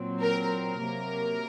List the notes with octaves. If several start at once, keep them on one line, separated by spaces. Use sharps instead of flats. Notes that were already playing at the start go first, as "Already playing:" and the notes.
Already playing: A#2 F#3 C4
A#4
A#4
C3 F#3 A#3